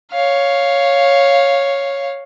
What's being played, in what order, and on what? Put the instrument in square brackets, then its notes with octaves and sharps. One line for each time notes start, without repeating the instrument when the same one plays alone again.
[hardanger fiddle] C#5 F5